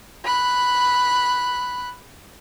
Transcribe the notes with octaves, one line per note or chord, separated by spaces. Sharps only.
B5 F#6